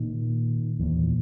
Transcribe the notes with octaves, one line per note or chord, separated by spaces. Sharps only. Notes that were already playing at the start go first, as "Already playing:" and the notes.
Already playing: A#2 D#3
E2 A#2 E3